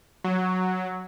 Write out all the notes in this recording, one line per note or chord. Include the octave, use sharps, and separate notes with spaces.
F#3